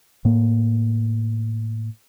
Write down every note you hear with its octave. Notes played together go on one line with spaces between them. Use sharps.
A2 A#3